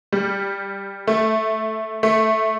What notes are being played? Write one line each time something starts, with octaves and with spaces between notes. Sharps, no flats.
G3
A3
A3